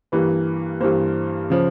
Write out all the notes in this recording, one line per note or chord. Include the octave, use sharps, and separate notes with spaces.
G2 E3 G3 A#3 B4
G2 E3 G3 A#3 C5
C#3 F3